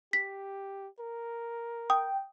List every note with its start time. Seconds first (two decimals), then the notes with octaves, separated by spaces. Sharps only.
0.13 G4 B6
1.00 A#4
1.90 G5 D#6